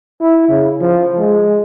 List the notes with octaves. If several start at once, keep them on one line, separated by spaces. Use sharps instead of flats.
E4
C#3
F3
G#3